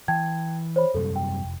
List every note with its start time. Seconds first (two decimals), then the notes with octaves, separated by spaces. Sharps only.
0.08 E3 G5 A5 G#6
0.76 C5 C#5 B5
0.94 F#2 C3 G3 A4
1.16 G5
1.43 F1